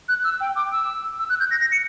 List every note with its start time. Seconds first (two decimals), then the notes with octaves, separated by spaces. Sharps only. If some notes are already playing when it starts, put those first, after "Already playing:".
0.09 F#6
0.24 E6
0.41 G5
0.56 D6
0.72 E6
1.19 E6
1.29 F#6
1.40 G6
1.51 A#6
1.61 A#6
1.72 C#7